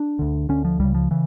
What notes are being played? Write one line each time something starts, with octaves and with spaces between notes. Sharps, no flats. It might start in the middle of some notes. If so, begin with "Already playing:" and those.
Already playing: D4
D2 D3
D2 D3 C#4
F3
C#2 C#3 G3
F3
C#3 E3